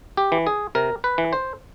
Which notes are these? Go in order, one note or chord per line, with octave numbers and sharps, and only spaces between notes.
G4
E3
G#4
C3 A#4
B4
E3
C5